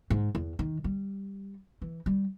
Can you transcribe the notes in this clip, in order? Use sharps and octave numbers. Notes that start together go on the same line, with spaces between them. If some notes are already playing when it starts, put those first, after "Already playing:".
G#2
E2
D#3
G3
E3
G3